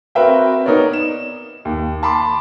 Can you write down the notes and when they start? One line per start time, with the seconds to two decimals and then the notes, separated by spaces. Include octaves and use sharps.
0.15 C4 F#4 A#4 B4 E5 G5
0.66 B3 D#4 A#4 C#5 D5
0.93 E7
1.65 D#2
2.03 A5 B5 C6 D6